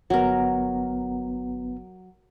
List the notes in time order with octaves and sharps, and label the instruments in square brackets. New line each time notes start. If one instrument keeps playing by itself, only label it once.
[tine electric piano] G1 B3 [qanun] F#3 A#4